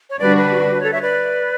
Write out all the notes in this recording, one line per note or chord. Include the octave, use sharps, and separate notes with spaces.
C#5
D3 G3 D4 F#4 B4 D5
B4
A4 C#5
C#5 E5
B4 D5